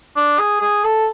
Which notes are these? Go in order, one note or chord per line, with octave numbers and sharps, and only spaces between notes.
D4
G#4
G#4
A4